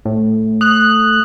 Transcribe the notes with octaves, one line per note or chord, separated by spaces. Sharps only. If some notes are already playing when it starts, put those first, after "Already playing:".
A2
D#6 F#6